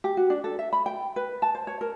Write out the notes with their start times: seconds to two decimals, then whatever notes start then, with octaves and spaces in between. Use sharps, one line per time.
0.04 G4
0.17 F#4
0.30 D4
0.44 A4
0.59 E5
0.73 B5
0.86 G5
1.16 B4
1.42 A5
1.55 C5
1.67 C#5
1.81 A#4